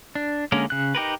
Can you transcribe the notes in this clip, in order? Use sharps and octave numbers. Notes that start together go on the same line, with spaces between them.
D4
D3 G#3 A#3 C#4 A#4
C#3 F#6
D#4 G4 A#4 B4